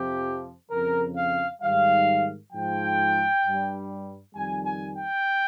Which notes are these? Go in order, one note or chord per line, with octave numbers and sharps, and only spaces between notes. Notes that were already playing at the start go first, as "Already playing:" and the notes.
Already playing: F2 C3 F3 G4
F2 C#3 F3 A#4
F5
G#2 D#3 G3 F5
G#2 F3 G5
G2 G3
F2 D#3 G3 G#5
G#5
G5